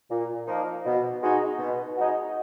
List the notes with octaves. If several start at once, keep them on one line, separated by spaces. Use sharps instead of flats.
A#2
F3 A#3 D#4
B2
G#3 D#4 F#4
B2
G#3 D#4 F#4